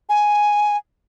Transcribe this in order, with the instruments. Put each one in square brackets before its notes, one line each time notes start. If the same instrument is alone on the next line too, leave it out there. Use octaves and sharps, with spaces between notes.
[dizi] G#5